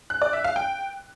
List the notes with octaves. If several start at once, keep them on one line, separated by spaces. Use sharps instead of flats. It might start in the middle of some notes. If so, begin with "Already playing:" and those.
F#6
D5
E5
F5
G5